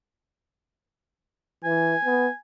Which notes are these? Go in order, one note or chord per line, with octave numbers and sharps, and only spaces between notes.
E3 G#5
B3